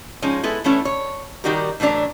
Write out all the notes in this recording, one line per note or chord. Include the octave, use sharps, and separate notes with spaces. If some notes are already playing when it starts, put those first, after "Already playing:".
F3 G#3 C#4 D#4
G#3 B3 E4 A4
E3 A3 B3 C#4 E4
C#5
D#3 G3 D#4 F#4 G4 A#4
A2 E3 F#3 D4 A#5